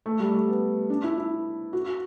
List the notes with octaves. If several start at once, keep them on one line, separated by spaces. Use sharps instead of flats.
A3
G3
A3
B3
D4
E4
E4
F#4